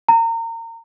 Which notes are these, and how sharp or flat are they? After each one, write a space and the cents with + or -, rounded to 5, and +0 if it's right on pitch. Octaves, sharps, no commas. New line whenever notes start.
A#5 -30